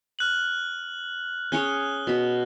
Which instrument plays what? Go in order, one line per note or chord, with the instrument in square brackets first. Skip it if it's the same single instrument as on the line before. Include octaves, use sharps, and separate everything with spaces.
[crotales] F6 F#6 F#7
[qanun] C#4 G#4 C#5 [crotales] F#6 G7
[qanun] B2 B5